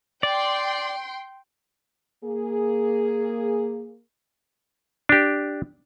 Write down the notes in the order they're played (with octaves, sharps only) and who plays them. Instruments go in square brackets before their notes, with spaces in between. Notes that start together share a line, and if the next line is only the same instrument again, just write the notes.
[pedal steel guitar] D5 [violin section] G5 C6
[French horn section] A#3 G#4
[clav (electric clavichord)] D4 G4